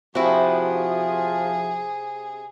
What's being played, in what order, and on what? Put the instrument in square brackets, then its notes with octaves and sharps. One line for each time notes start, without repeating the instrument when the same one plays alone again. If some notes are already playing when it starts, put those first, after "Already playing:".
[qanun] C3 [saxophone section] F3 [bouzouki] E4 F#4 [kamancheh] G#4